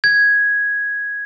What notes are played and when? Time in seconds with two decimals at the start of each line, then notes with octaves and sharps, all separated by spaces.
0.04 G#6